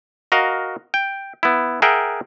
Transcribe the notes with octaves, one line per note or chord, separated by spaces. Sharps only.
F#4 A#4 D#5 F5
G5
B3 E4
G#4 A#4 E5 F#5 G5